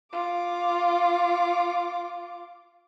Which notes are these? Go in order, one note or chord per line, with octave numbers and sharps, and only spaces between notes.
F4 D6